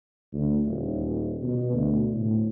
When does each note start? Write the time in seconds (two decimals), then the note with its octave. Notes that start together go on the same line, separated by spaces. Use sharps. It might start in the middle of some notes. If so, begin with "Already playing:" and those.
0.33 D2
0.66 D#1
1.42 B2
1.73 D2
2.13 A2